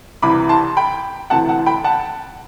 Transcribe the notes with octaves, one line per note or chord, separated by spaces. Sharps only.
C2 C3 E3 B5 D6
A5 C6
G5 B5
D2 C3 E3 F#5 A5
F#5 A5
G5 B5
F#5 A5